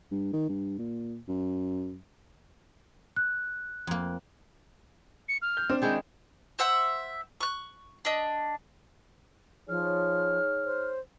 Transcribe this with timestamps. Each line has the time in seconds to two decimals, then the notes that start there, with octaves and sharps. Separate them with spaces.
0.11 G2
0.33 D#3
0.49 G2
0.79 A#2
1.28 F#2
3.16 F#6
3.87 F2 A#3
5.29 C#7
5.42 F6
5.57 G6
5.70 C4 D4
5.82 D#3 G#3 E4 G6
6.59 C5 E5 F#5 E6
7.41 C#6 F#6
8.05 D4 D#5
9.69 F3 D#4 G#4 C#5 F6
10.65 C5